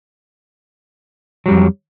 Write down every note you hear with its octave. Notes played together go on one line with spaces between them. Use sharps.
F2 F#3 G3